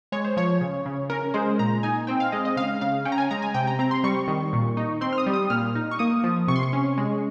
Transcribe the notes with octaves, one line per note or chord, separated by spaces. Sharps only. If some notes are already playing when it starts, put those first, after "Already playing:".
G#3 C#5
C5
F3 C#5
C#3
C#3
C#4 A#4
G#3 C5
A#2 A#5
D#4 G#5
C4 G5
F5
G#3 D#5
D#5
C#3 F5
C#3 F5
C#4 G5
A#5
G#5
G#3 A#5
G#5
C3 G5
A#5
C4 A#5
C6
G3 C#6
D#3
A#2
D#4
C4 C6
F6
D#6
G3
D#6
A#2 F6
D#4
C#6
A#3 D#6
F3
C3 C#6
C6
C#6
C#4
G#3